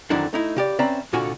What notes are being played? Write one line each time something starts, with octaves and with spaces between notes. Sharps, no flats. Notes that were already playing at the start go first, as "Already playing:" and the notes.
F2 D3 D#3 F#3 D4 E4
A3 D#4 E4
C#3 G4 D5
C4 C#4 B4 D5 E5 A#5
C2 A#2 D3 F4 F#4 G#5